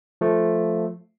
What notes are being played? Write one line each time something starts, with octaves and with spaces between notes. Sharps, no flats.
F3 A3